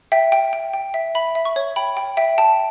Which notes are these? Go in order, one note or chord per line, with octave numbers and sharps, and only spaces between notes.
E5 G5
G5
G5
G5
E5
E5 B5
E5
C#6
C#5
G5 B5
G5
E5 G5
G5 A5